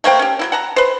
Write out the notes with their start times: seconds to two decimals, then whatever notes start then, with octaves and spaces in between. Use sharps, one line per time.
0.04 A3 A#3 C5 G5
0.19 C#4 G4
0.39 F#3 A#3 E4
0.52 F#5 A5 A#5
0.76 B4 C5